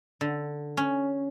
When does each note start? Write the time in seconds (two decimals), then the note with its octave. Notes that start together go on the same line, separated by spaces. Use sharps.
0.21 D3
0.77 C#4